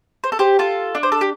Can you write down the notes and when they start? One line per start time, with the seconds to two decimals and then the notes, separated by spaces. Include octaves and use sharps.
0.24 C5
0.32 A4
0.39 G4 C5
0.59 F4 A4
0.95 D4
1.03 C5
1.12 A4
1.21 G4